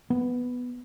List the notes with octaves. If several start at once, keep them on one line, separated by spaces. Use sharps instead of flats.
B3